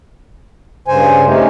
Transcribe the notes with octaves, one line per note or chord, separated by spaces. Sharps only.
G2 C#3 C5 G#5
A3 C4 C#4 D#4 G4